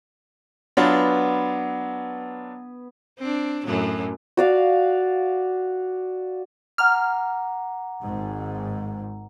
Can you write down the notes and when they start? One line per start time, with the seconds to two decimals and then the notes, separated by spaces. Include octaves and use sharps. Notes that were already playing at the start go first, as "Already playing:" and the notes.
0.77 F#3 B3 D4 F4 B4
3.19 C4 D4
3.66 F#2 A2 F#3
4.37 F#4 D5 F5
6.78 F#5 A#5 D6 F6
8.01 G#1 G#2